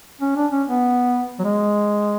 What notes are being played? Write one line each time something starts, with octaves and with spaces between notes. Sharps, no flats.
C#4
D4
C#4
B3
F#3
G#3